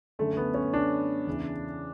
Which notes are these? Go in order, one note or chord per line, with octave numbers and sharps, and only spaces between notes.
F#2 D3 A3
B3
C#4
D4
E2 C#3 E3